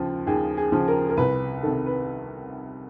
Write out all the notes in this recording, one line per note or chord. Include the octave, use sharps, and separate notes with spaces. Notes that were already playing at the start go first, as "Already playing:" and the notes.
Already playing: D#2 C#3 F3
D#2 G#4
G#4
C#3 F3
A#4
A#4
C2 B4
C3 D#3 A4
B4